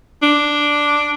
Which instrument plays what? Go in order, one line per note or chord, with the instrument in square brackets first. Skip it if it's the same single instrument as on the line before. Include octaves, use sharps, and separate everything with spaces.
[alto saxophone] D4